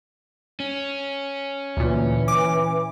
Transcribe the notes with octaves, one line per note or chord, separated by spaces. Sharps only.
C#4
D2 A#2 E3
D6